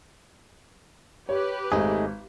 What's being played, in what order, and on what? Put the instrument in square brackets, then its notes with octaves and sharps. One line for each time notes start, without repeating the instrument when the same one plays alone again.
[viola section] G4 B4 [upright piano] C#5
[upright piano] G#1 [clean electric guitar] A3 D#4 G#4